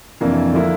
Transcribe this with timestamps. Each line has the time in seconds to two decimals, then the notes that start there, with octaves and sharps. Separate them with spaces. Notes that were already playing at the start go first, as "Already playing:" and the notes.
0.21 F2 C3 E3 A#3 D4
0.53 D3 F3 A#3 E4